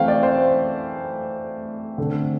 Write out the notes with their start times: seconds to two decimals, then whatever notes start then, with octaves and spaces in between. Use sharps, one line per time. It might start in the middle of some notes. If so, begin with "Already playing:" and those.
Already playing: E3 A3 C4 F5 G5
0.08 D5
0.23 C5
1.98 D3 A3 C4